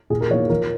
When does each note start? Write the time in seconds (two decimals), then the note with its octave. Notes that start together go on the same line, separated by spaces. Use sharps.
0.10 A#2 G#4
0.21 A#4
0.30 F3 A#3 D#4 C#5
0.50 F3 A#4